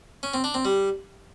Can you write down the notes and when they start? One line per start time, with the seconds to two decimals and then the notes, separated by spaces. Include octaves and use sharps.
0.23 C#4
0.34 C4
0.44 D4
0.54 C4
0.65 G3